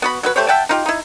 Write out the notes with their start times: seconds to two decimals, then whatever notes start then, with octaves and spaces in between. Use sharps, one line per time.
0.02 B3 F#4 B5
0.23 F#3 F#4 B4
0.36 A3 G4 C5 C#5
0.48 E5 F#5 G5 A5
0.69 D#4 F4 G4
0.86 D#4 E4